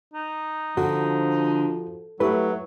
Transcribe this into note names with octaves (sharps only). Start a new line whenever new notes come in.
D#4
D3 F3 F#4
F#3 A3 E4 G4 B4